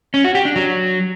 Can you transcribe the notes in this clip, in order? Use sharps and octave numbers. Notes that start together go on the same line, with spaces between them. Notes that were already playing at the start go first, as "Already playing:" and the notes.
C#4
F#4
G4
D4
F#3